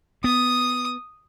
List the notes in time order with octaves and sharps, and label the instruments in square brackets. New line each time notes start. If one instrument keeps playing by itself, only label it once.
[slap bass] B3 [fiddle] D#6